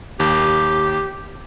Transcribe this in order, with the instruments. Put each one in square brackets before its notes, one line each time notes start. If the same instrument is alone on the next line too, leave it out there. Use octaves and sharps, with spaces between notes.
[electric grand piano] D#2 [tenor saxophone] G4